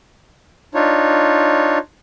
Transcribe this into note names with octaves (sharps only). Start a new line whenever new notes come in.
D4 D#4 F4 C#5